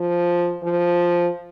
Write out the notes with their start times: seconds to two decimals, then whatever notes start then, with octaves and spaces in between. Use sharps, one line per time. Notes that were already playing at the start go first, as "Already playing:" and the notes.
Already playing: F3
0.63 F3